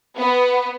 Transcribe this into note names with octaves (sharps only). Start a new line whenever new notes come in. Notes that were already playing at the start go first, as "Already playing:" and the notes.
B3